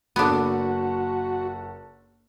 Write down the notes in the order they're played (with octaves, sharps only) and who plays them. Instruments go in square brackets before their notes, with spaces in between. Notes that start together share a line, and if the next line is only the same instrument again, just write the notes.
[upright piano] F#1 A4 [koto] B3 D4 [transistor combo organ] F#4